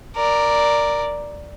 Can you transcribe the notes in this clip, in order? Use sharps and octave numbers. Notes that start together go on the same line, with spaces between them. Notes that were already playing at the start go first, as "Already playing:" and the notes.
A#4 D5